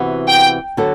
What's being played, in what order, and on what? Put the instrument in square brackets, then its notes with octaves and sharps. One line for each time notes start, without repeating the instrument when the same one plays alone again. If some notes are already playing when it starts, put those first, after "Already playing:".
Already playing: [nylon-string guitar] C3 E3 B3 F#4
[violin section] G5
[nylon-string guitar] D3 F#3 B3 F#4 A4